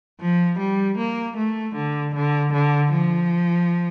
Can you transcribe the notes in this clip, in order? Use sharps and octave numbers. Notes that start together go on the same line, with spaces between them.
F3
G3
A#3
A3
D3
D3
D3
F3